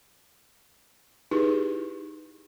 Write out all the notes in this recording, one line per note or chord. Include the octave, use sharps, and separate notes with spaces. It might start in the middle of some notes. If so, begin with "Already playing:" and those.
D#4 E4 G4 G#4 B4